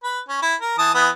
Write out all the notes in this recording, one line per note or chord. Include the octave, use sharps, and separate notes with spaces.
B4
C#4
E4
A#4
E3 A5 D#6
E3 B3 D#6